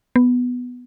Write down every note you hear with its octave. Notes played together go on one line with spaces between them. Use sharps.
B3